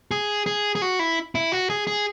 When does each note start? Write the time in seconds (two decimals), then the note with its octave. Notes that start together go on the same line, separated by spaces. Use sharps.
0.11 G#4
0.46 G#4
0.75 G#4
0.82 F#4
0.99 E4
1.35 E4
1.52 F#4
1.70 G#4
1.87 G#4